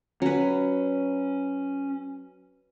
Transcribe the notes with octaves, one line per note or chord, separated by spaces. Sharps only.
F#3 C#4 B4